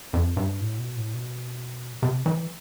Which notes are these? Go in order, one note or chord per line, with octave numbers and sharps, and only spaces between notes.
F2
G2
A2
B2
A2
B2
C3
E3